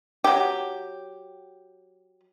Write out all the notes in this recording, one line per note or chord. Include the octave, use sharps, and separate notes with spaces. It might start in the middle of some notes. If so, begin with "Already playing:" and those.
F#3 G4